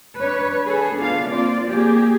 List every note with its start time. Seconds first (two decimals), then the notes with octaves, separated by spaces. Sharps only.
0.20 D4 B4 C#5
0.66 G#4 A4 B4
0.97 B3 D4 F4 F5
1.29 A#3 C4 F4 D5
1.71 A#3 G4 G#4